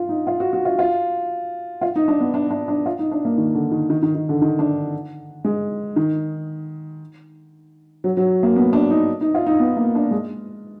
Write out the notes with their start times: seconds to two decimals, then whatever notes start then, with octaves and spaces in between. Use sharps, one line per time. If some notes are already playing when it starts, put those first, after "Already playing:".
Already playing: F4
0.09 D#4
0.27 F4
0.40 F#4
0.53 F#4
0.65 F4
0.79 F4
1.81 F4
1.96 D#4
2.08 D4
2.20 B3
2.34 D4
2.51 D4
2.68 D4
2.86 F4
2.99 D#4
3.11 D4
3.25 A#3
3.38 D#3
3.55 D3
3.72 D#3
3.90 D#3
4.02 D#3
4.15 D#3
4.29 D3
4.42 D#3
4.59 D4
5.44 G#3
5.96 D#3
8.04 F#3
8.17 F#3
8.43 A#3
8.56 B3
8.73 D4
8.90 D#4
9.21 D#4
9.35 F4
9.46 D#4
9.60 B3
9.77 A#3
9.95 D4
10.11 G#3